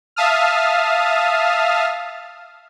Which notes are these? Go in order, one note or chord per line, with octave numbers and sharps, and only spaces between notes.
E5 F5 A5 D#6 F6